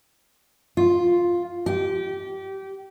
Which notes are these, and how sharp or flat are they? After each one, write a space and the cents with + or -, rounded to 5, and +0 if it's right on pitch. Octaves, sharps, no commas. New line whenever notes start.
F4 +5
G4 -25